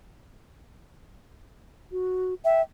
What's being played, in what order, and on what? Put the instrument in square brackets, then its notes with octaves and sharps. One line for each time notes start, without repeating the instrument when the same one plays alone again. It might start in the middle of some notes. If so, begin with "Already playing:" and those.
[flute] F#4
[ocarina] E5 [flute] G5